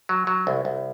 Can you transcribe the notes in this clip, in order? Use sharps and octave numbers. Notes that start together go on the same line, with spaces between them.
F#3
F#3
C2
C2